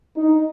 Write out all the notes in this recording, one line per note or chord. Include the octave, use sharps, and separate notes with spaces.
D#4